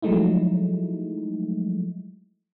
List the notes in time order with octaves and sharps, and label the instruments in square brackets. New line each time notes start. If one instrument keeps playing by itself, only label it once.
[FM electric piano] F3 F#3 G#3 A3 D#4 E4